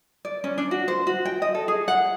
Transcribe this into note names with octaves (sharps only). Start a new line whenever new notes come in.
D5
C#4
D4
F#4
C5
F#4
G5
D#5
A4
G#4
F#5